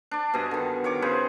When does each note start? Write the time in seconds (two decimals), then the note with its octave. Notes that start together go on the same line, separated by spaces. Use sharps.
0.11 D4 D5
0.34 G2 B2 G#4 D#5
0.51 D3 D#3
0.84 D#3 C#5 D6
1.02 C#3 G#4 B4 C5